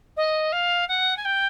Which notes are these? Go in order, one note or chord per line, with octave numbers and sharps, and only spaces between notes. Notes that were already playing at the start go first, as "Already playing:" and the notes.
D#5
F5
F#5
G#5
G5